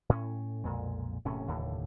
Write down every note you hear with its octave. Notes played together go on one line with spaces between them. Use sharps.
A2 C#4
B1 F2 A#2 G#3
E1 A2 C3 C#4
F1 D#2 A2 D3